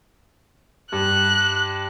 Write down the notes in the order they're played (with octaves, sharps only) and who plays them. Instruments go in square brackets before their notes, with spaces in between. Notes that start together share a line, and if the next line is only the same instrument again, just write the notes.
[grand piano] G2 [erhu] F#6